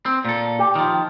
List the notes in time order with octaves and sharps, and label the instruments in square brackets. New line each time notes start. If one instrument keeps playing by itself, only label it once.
[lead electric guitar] C4
A#2 A4
[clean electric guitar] G4
[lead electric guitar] D#3 F3